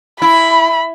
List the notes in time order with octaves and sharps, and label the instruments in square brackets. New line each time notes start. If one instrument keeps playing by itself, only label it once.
[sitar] E4 [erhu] B5